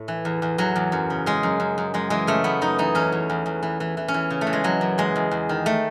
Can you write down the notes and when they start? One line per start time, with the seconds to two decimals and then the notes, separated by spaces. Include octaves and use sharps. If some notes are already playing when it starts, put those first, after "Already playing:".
Already playing: A2 A3
0.08 E3
0.25 E2
0.42 E2
0.58 E2 F#3
0.76 E2
0.92 F#2
1.10 C#3
1.26 C#3 G#3
1.43 F#2
1.60 F#2
1.78 F#2
1.94 F#2 G#3
2.10 E3 G#3
2.27 C#3 A3
2.44 F#2 B3
2.61 F#2 D#4
2.78 E3 D#4
2.95 E2 C#4
3.12 E2
3.30 E2
3.46 E2
3.63 E3
3.80 E3
3.97 E3
4.08 C#4
4.14 E3
4.30 C#3
4.41 A3
4.47 E3
4.53 G#3
4.64 E3 F#3
4.81 F#2
4.98 E2 G#3
5.16 E2
5.31 E2
5.49 D#3
5.66 A3